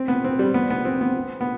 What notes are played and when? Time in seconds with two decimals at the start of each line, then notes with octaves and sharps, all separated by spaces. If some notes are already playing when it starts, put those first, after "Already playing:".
Already playing: C4
0.08 B3
0.24 C4
0.39 G3
0.54 B3
0.70 B3
0.85 C4
1.01 B3
1.41 B3